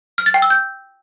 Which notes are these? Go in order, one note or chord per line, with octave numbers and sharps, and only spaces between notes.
F6
A6
G5
E6
G6